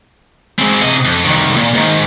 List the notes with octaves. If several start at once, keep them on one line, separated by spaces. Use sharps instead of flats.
G#3 C4
C3 D#5
F2
C2 D#3
A#2
G#2 D#3